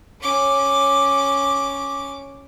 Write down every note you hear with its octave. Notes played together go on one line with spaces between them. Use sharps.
C#4 D6